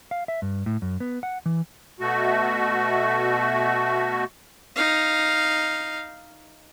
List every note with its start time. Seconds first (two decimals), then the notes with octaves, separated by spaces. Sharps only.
0.11 F5
0.28 E5
0.42 G2
0.66 A2
0.82 F#2
1.00 B3
1.23 F#5
1.46 E3
2.00 B2 A3 F#4
4.76 D#4 F5